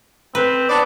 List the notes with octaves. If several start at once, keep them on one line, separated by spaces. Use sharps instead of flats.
C4 B4
B3 D4 D5